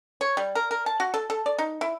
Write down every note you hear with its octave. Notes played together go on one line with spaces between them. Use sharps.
C#5
G3
A#4
A#4
A5
F#4
A4
A4
D5
D#4
E4